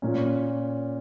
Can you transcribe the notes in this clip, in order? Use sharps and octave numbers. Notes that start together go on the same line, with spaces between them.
A#2 A#3 C#4